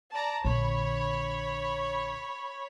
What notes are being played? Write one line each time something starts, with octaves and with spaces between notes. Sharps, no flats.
D5 A5 A#5
A#1 D3 C#5 B5